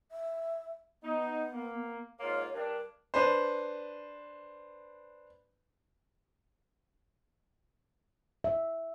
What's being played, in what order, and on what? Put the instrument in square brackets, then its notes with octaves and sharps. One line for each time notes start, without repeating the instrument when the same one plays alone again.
[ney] E5
[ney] B3 [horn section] D#4
[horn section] A#3
[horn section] G#2 A#3 F4 [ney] C#5
[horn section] G2 D4 [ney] A#4
[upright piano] D4 B4 C5
[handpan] E5